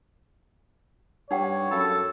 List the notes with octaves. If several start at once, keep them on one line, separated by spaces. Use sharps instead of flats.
G2 D#4 C#5 F#5 G5
F#2 A4 F5 B5